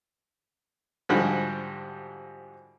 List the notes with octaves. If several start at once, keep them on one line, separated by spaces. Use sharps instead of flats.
G#2 D3 F3 G3 F#4